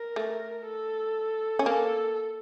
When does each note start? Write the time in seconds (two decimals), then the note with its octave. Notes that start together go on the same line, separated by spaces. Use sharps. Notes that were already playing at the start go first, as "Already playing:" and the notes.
Already playing: A#4
0.16 A3
0.66 A4
1.59 C#4
1.66 A#3 A4